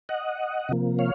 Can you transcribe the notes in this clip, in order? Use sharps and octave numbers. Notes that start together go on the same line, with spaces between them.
D#5 F#5
C3 F3 A#3
C#5 F5